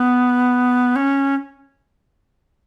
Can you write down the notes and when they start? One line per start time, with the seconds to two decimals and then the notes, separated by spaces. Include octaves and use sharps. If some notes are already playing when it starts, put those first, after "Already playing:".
Already playing: B3
0.96 C#4